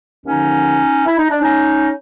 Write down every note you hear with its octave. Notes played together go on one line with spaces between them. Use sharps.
D#2 D3 F3 C#4 D#4
E4
D#4
D4
C#4 D#4